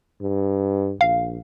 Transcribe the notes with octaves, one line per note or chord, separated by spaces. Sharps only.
G2
A#1 F5